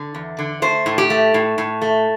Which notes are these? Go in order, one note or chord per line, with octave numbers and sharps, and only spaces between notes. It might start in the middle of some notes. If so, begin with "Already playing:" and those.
Already playing: D3
E2
D3
A3 C5
A2
G4
A3
A2
A2
A3